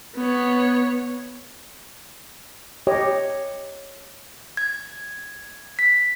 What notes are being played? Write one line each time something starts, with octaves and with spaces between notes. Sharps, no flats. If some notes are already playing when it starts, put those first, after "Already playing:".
B3 C#5
G4 C#5 D#5
G#6
B6